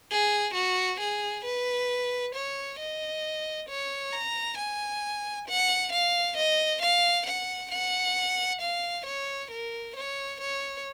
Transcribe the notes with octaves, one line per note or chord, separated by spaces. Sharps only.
G#4
F#4
G#4
B4
C#5
D#5
C#5
A#5
G#5
F#5
F5
D#5
F5
F#5
F#5
F5
C#5
A#4
C#5
C#5